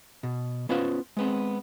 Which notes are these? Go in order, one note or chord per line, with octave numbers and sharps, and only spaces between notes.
B2
B3 C#4 F4 B4 C5
G#3 B3 C4